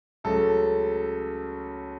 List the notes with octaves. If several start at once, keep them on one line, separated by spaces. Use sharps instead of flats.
C#2 C#3 F#3 A3 A4